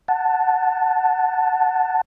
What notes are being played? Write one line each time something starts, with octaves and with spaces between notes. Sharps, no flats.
F#5 A5